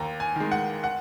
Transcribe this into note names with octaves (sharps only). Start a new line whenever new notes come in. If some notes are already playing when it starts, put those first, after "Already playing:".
Already playing: D#2 A#5
G#5
D#3 G#3
F#5
F#5